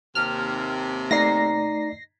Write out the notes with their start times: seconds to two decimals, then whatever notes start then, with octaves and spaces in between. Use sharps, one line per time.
0.15 D#2 C3 F6
1.11 A3 D#4 D5 A#6 C7